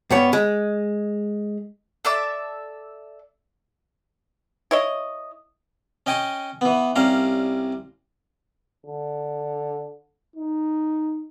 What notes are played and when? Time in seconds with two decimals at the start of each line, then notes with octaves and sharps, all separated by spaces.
0.10 G2 B3 C#5
0.33 G#3
2.05 A4 D5 E5 D6
4.71 E4 C#5 D#5
6.06 C#4 D#5 G5 G#5 C#6
6.61 E3 B3
6.96 C2 G3 C#4 F5 A#5
8.86 D3
10.36 D#4